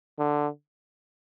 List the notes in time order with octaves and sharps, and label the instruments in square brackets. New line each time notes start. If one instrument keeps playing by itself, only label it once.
[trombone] D3